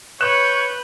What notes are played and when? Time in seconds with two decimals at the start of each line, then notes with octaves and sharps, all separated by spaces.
0.21 B4 C#5 F#6 G6 E7